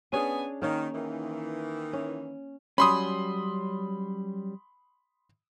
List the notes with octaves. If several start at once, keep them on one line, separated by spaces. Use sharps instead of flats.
B3 C#4 D4 G#4 G#5
D#3 A#3 C#4
D#3 E3
C#4
F#3 G3 C#4 B5 C6 D#6